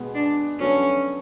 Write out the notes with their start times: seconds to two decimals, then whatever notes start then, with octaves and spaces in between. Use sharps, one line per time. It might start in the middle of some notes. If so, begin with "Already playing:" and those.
Already playing: B2 G#3 B3
0.15 D4
0.60 F#3 B3 C#4 D4 A4